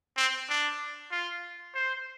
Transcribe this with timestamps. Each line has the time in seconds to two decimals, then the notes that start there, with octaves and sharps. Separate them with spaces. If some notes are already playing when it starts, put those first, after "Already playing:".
0.17 C4
0.50 D4
1.12 F4
1.75 C5